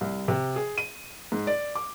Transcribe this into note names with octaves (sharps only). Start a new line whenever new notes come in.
C2
C3
G#4
D#7
G#2
D5
D6